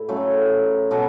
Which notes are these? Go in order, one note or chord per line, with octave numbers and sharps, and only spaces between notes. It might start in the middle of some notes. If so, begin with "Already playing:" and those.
Already playing: A2 E4
C#3 F#3 A3
B2 F#3 A3